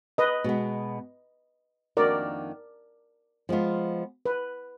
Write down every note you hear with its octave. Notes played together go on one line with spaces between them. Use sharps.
B4 D#5
B2 G#3 B3
F2 D#3 A#3 D4 F#4 A#4 D5
F3 G#3 B3 F4
B4